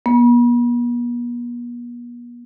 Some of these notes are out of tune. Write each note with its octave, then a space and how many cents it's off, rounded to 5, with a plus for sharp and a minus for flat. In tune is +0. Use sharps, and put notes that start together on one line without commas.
B3 -45